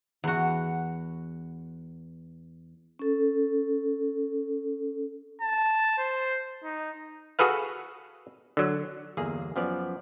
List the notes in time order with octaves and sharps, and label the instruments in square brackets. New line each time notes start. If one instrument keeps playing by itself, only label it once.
[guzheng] E2 F#4
[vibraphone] C#4 A4
[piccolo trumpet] A5
C5
D#4
[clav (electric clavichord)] F#4 G#4 A4 B4 F5
D3 F#3
G1 E2 A#3 G#4
F#2 F3 B3 D5